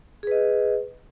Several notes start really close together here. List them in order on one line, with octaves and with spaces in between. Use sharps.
G#4 B4 D#5